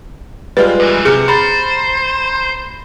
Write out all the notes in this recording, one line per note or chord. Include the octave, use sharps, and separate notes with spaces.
G3 G#3 F4 B4
F#2 E3
C3 G#4 F6 C#7
C5 A#5 B5 A6